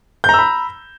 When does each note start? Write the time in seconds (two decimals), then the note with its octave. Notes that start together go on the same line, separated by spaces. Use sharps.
0.24 G6
0.29 A#5
0.34 E6
0.39 B5